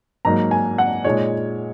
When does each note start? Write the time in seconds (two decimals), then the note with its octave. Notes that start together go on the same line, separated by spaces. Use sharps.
0.25 G#2 F#3 A#3 D#4 A#5
0.51 G#5
0.78 F#5
1.04 A#2 G#3 D#4 C#5